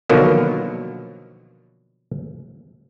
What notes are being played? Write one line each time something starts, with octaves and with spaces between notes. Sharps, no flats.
B2 D3 D#3 F3 F#3 A#3